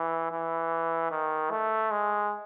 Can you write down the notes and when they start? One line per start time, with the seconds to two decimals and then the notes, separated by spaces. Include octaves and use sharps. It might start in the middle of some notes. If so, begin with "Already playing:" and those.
Already playing: E3
0.32 E3
1.11 D#3
1.51 A3
1.91 G#3